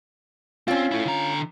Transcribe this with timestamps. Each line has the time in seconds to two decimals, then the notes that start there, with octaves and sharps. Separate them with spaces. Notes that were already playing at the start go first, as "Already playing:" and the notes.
0.68 C4 C#4 F4
0.92 E4 A4
1.06 D3 A#5